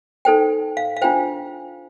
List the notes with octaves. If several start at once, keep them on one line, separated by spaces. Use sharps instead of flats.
D#4 A4 C5 G5
F5
F5
D4 F4 C5 G5